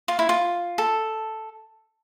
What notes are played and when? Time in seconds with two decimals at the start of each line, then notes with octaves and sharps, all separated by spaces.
0.08 F4
0.19 E4
0.29 F4
0.78 A4